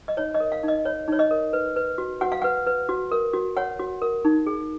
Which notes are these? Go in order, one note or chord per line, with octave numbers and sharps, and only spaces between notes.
D#5
D#4 C#5
D#5
A#4
F5
D#4
D#5
C#5
D#4 C#5
D#5
A#4
B4
B4
F#4
F#4 F#5
F5
B4 F#5
B4
F#4
A#4
F#4
C#5 F#5
F#4
A#4
D#4
G#4